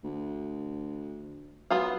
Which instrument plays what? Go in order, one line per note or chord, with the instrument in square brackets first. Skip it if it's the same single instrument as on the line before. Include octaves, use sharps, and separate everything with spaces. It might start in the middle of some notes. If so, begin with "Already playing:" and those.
[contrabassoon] D2
[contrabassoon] F#3 [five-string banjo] B3 F4 F5